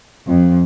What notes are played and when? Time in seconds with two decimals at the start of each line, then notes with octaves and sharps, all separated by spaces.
0.28 F2